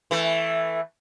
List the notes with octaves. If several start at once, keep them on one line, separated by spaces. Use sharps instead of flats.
E3 A3